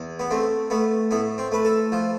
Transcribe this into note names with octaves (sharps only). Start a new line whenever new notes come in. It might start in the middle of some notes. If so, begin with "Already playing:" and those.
Already playing: E2
B3
A3 C4
A3 B3
A2 B3
C4
A3 B4
A4
F3